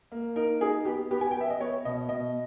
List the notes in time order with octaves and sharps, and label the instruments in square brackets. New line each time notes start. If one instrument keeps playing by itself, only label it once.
[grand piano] A#3
D#4 A#4
D#4 G#4
B3 G4
B3 G4
G#5
B3 G5
E5
D#5
B3 C#5
B2 D#5
B2 D#5